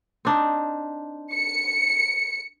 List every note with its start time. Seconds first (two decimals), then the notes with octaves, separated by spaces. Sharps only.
0.25 C4 D4 D#4
1.33 C#7